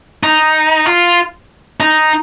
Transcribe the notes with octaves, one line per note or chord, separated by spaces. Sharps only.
D#4
F4
D#4